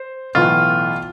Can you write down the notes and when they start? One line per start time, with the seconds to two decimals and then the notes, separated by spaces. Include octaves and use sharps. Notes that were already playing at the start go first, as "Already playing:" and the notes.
Already playing: C5
0.35 B1 A2 E3 B3 F4